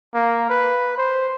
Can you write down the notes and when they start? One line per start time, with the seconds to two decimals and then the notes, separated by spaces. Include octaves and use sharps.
0.14 A#3
0.50 B4
0.98 C5